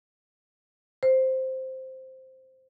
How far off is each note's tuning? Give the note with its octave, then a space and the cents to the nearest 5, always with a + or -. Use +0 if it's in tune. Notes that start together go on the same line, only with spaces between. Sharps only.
C5 +0